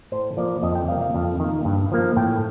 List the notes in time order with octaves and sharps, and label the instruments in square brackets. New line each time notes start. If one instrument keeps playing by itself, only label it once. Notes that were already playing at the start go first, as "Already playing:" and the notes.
[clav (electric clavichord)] A2 C5
F3 A#3 D5
F2 D#5
G5
C3 G3 A#3 F5
F5
F2
D#3 A#3
G2
F3 A#3
A2 G5